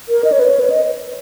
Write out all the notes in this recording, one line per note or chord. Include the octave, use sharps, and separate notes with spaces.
A#4
D#5
C#5
B4
C#5
B4
D#5